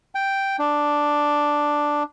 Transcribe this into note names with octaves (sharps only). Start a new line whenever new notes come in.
G5
D4